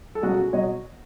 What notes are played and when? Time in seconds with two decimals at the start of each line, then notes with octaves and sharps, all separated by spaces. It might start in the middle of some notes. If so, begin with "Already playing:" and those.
0.15 A4
0.22 C#2 B2 F#3 F#4 G#4
0.53 B2 F#3 C#5 D#5